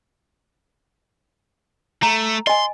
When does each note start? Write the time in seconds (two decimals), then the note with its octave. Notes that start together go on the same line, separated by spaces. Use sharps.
2.03 A3 A#5
2.47 D#5 G#5 C6